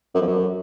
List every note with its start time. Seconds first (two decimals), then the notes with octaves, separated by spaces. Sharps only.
0.15 F#2
0.21 F2
0.27 F#2